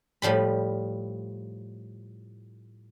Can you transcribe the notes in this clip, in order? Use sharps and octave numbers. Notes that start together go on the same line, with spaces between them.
A2 F3 G3 B5